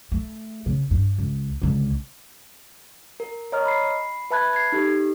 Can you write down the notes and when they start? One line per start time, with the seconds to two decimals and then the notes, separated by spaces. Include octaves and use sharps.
0.12 A3
0.66 C#3
0.91 G2
1.18 C#2
1.62 C#2 D3
3.20 A#4
3.52 C#5 D#5 A#5 F6
3.66 B5 C7
4.31 B4 E5 A5 B5 F#6 G#6
4.53 G#6 C7
4.72 D#4 G4 A4